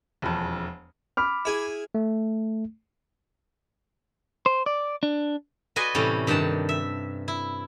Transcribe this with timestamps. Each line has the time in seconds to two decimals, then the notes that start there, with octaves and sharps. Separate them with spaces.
0.22 E1 F2
1.17 B5 D6 F6
1.45 E4 G#4
1.95 A3
4.46 C5
4.66 D5
5.03 D4
5.76 F#4 B4 D5 D#5 G#5 C6
5.95 A2 C3 E3 G3 C#4
6.27 G2 D#3 D5 F#5 A5
6.69 E5
7.28 E4